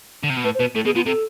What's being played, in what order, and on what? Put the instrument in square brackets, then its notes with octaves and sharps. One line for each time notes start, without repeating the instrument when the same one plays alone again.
[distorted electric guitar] D3
C3
B2
[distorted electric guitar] A2 [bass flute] B4
[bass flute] C5
[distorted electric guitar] B2 [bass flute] B4
[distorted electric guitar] A2 [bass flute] A4
[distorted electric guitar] B2 [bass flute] G#4
[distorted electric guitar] B2 [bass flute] F4
[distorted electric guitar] C3 [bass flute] A4